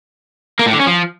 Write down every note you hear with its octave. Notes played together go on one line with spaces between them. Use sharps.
A#3
A2
D3
C#4
F3